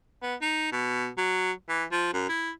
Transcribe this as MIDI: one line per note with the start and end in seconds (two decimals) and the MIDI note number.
0.23 0.35 59
0.41 0.70 63
0.73 1.08 47
1.17 1.52 54
1.69 1.84 52
1.92 2.14 53
2.14 2.26 42
2.29 2.50 64